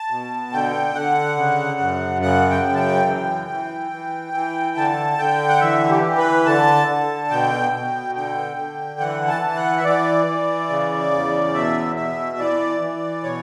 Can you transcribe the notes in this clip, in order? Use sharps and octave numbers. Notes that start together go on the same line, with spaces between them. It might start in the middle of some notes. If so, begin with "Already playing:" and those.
Already playing: A5
B2
D3 G5
D3 F#5
C#3
F#2
C#3 F#5
G5
F#2
A5
G5
E3
E3
E3
E3
D3 A5
D3 G5
F#5
E3 E5
G4
E3
B4
D3 A5
D3
B2 G5
B2
D3 G5
D3
E3 F#5
A5
E3
F#5
E5
E3 D5
E3
C#3
E2
B2 E5
B2 E5
E3 D5
E3
B2 C#5